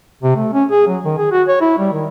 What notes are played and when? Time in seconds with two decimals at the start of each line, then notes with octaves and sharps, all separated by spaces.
0.23 C3
0.36 A3
0.53 C#4
0.71 G#4
0.87 F#3
1.04 D#3
1.18 G#4
1.32 F#4
1.48 C#5
1.61 E4
1.79 G3
1.92 D#3